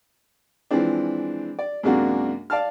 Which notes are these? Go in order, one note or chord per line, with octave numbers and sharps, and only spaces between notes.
E3 F3 G#3 C4 D4
D5
F#2 C3 G#3 A#3 D4 F#4
D5 F5 A5 F6